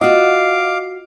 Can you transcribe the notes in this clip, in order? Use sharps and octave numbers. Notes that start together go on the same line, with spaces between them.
F4 F#4 D#5 F5 F#5 D6